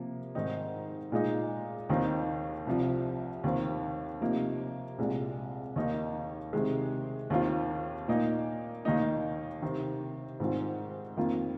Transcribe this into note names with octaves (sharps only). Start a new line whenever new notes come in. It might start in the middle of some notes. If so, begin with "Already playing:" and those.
Already playing: C3 F3 A#3
G#2 D#3 C4 D#4
A#2 G#3 D#4
D#2 D#3 C4 D#4
C2 C3 F3
D#2 D#3 C4
C3 F3 A#3 D#4
C2 A#2 G#3
D#2 D#3 A#3 D#4
C3 D#3 G#3
D#2 D#3 C4 F4
A#2 A#3 D#4
D#2 D#3 A#3 D#4
C3 D#3 C4
G#2 D#3 C4 F4
F2 D#3 A#3 F4